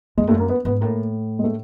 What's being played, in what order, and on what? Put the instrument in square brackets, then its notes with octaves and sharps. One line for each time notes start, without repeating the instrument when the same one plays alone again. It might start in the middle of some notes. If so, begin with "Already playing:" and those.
[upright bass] F#2 [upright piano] G#3
[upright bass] G2 [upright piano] A3
[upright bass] F#2
[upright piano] A#3
B3
[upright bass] G#2 [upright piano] B3
[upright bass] A2 [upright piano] A#3
[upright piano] G#3
A3